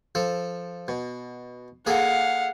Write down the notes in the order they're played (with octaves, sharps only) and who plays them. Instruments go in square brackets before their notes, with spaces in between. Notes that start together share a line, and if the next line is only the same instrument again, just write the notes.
[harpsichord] F3 A4
B2
[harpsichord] A#3 G#4 A4 [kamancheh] F5 F#5